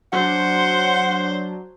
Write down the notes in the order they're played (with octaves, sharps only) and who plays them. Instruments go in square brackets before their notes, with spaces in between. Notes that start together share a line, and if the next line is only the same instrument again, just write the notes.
[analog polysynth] F#3 D4 [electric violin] C5 [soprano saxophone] F#5